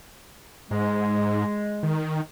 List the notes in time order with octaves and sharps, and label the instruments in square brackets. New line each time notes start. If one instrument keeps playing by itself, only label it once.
[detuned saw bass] G#2 [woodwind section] G#3
[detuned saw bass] D#3